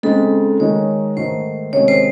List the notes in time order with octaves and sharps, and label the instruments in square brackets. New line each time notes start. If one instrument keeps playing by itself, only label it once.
[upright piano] C#3 G#3 C4 D#4 [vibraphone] A4
[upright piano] D#3 G#3 D#4 [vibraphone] C#5
[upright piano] G#2 D#3 A3 [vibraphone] C5
[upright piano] C3 D#3 G#3 C#4 [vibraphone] C#5
[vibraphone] C5